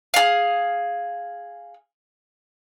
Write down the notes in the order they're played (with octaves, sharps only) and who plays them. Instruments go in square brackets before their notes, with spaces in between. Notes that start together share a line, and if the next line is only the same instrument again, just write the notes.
[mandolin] G#4 F5